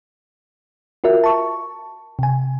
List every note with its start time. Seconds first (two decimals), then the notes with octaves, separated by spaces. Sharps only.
1.04 F4 F#4 A#4 E5
1.24 A5 C#6
2.19 C3 G#5